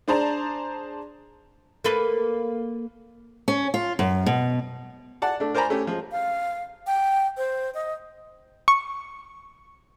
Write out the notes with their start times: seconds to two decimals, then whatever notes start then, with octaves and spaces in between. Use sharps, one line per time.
0.08 D4 G#4 C5 D5 A5 A#5
1.84 A#3 A4 B4
3.48 C#4
3.74 F4
3.99 F#2
4.26 B2
5.22 D5 F#5 A5
5.40 A3 D4
5.54 A#4 C5 D5 G#5 A#5 B5
5.70 A3 C#4 G4
5.87 F3 G#3
6.11 F5
6.87 G5
7.37 C5
7.74 D#5
8.68 C#6